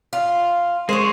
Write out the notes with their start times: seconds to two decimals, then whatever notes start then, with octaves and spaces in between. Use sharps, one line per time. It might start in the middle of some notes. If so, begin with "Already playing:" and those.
0.13 F4
0.89 G#3 C5 C#5